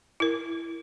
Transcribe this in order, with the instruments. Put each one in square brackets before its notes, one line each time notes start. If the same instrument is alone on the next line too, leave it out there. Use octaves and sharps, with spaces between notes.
[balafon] E4 A#4